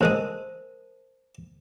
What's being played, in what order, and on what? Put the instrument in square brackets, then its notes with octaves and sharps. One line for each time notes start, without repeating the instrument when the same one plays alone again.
[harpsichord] A1 G#3 D#6 [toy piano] A#4 C5 A5